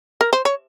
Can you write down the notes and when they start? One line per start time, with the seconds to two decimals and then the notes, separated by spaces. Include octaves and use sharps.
0.21 A#4
0.33 C5
0.45 C#5